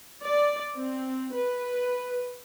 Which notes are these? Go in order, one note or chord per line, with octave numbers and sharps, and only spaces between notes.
D5
C4
B4